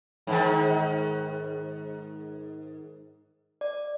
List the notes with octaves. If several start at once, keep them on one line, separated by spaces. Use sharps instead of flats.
G#2 D#3
D5